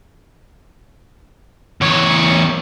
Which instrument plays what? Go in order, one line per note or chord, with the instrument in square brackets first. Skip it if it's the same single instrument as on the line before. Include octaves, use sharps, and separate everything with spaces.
[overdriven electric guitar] E2 C#5